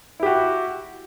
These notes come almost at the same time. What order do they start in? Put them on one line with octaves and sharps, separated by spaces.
E4 G4 F#4